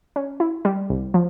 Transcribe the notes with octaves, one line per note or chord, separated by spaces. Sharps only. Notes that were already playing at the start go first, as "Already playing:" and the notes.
C#4
E4
G3
C2
F3